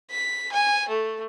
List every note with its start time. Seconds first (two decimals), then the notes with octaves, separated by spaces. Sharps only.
0.10 B6
0.52 G#5
0.88 A3